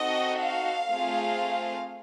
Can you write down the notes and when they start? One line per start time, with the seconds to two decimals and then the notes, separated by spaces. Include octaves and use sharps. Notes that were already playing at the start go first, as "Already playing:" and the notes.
Already playing: C4 D#4 F#4 A4 D#5
0.40 F5
0.90 A3 C4 F4 G#4